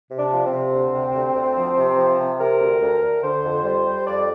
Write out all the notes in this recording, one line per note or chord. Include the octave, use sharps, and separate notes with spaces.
C3
D4
F3
C4
C3
D2
C3
D2
D2
F3
C3
F3
C3
C3 A#4
D2
D2
D2
D3 C5
F2
G3
G3
F2 D5